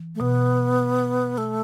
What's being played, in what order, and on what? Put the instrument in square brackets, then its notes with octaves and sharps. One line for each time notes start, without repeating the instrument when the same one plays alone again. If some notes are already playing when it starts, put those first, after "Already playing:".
Already playing: [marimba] E3
[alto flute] A3
[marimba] B2 [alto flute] B3
[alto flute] A3